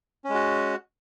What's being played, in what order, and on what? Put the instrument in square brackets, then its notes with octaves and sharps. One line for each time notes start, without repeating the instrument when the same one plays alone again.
[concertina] C#4
G#3
F#4